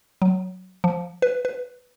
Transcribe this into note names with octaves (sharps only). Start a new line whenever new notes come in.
F#3
F3
B4
B4